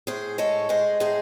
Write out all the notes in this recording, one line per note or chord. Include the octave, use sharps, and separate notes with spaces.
A2 G#4 C5
G#3 A4 C#5
G#3 G#4 C5
A2 G#4 C5